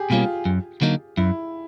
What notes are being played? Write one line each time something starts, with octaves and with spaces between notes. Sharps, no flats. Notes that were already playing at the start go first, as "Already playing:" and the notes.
Already playing: G4 G#4
B2 G3 A#3 C#4 F4
F#2
D3 F#3 A#3 D#4
F#2 E4